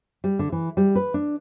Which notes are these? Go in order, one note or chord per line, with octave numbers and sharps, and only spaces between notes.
G3
D3
E3
G3
B4
D4